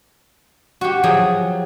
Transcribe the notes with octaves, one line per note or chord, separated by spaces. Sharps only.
F#4 G4
F3 F#3 G4 G#4